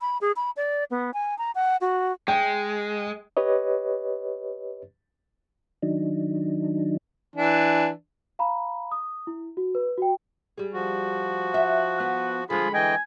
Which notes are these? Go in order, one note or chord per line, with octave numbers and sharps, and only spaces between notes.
B5
G#4
B5
D5
B3
G#5
A#5
F#5
F#4
G#3 G5
G4 B4 C#5 D#5
D#3 F#3 D4 D#4
E3 D4
F5 A#5 B5
D#6
E4
F#4
B4
F#4 G5
G3 G#4
F3 F#4
E5 F#5
B3
D3 F3 G#3 F4 G#4 B5
E3 D#5 G5 G#5